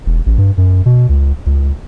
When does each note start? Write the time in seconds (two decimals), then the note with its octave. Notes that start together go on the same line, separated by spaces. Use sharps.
0.06 E1
0.26 A1
0.38 G2
0.58 F#2
0.86 B2
1.09 C#2
1.46 C#2